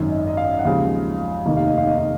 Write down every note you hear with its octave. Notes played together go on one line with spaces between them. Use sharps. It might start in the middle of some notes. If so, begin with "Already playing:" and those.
Already playing: G#1 F#2 D#3
D#5
D#5
F5
F#5
D#2 C#3 F3 G#3 F5
F1 D#2 D#3 A#3 D#5
F5
D#5
F5
D#5
F5